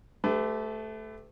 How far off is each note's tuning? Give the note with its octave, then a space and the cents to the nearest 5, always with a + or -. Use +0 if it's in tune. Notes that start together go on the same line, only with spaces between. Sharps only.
A3 -10 G4 +10 B4 +40